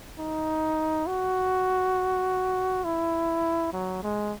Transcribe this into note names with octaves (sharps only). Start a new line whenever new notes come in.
D#4
F#4
E4
F#3
G#3